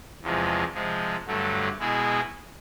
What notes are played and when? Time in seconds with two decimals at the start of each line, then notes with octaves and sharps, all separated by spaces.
0.23 E2 C3 F3 G#3
0.74 C3 F3 G#3
1.27 G2 D3 F#3 A3
1.79 B2 G#3 B3 E4 G#4